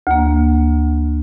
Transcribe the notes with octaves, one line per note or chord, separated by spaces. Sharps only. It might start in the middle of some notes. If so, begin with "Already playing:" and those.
D2 A#3